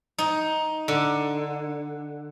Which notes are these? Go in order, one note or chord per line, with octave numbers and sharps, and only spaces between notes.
D#4
D3